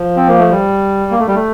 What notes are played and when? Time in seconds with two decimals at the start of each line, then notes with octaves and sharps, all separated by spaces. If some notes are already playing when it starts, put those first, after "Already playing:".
Already playing: F3
0.17 C4
0.28 A#3
0.39 A3
0.50 G3
1.11 A#3
1.19 A3
1.27 G3
1.35 A3